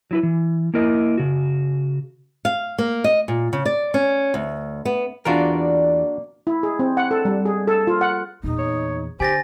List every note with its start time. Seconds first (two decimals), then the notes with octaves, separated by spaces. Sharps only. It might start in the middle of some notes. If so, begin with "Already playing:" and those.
0.11 F#3 E4 B4
0.23 E3
0.74 A#3 E4 A#4 D#5
1.17 C#3 F#4
2.45 F5
2.78 A#3
3.04 D#5
3.28 A#2
3.53 C#3
3.65 D5
3.94 C#4
4.34 D2
4.85 B3
5.25 E2 E3 A#3 D4 F4 F#4 A#4 D5
6.47 E4
6.63 G#4
6.79 C4
6.97 F#5
7.11 A4
7.25 G3
7.46 G#4
7.68 A4
7.87 F4
8.01 F#5
8.43 E2 A#2 D#4
8.59 C#5
9.20 D3 G4 C5 G#5 A6 A#6